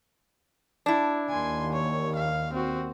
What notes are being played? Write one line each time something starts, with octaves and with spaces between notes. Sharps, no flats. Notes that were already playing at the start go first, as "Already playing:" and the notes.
D4 E4
D#2 G#5 C6
C#5
F5
C4 F#4